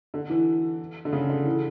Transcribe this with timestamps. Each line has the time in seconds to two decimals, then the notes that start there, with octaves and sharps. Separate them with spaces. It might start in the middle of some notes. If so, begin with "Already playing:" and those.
0.14 D3
0.30 E3
1.05 D3
1.13 C#3
1.29 D3
1.45 E3